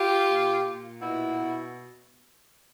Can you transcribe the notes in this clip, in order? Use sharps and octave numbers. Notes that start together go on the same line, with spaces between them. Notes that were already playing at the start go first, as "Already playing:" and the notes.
Already playing: F4 G4
A#2
A#2
B2 E4 F#4
B2